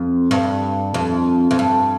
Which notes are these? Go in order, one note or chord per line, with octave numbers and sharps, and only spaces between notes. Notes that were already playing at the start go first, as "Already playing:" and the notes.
Already playing: F2
G2
F2
F2
G2